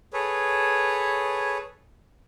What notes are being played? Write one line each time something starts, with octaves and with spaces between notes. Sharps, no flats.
G#4 A4 B4 C#5